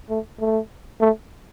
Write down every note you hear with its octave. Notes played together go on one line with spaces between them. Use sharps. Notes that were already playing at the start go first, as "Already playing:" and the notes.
A3
A3
A3